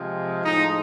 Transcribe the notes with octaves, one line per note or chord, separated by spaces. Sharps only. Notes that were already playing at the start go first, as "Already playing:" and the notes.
Already playing: C3 F3 G#3
A2 F3 G#3 D#4